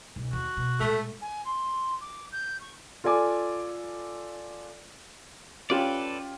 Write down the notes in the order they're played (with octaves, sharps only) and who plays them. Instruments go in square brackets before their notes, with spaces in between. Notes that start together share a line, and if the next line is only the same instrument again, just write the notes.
[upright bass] B1
[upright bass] D#2 [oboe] F#4
[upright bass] B2
[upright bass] A#2 G#3 [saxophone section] A3
[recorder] G#5
C6
D6
G6
C#6
[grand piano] F4 A4 D5 G#5 D6
[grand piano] C#4 F4 G4 [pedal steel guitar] A4 B4 D5